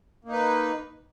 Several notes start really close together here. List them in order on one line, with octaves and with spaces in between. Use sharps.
A#3 D#4 B4